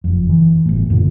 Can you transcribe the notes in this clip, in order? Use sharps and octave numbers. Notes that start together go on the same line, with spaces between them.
F#1 F2
E3
G1 A2
F#2 A#2 D3